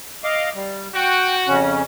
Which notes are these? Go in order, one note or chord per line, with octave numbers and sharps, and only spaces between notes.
D#5 F5 D6
G3
F#4 G5
F2 C#3 C#4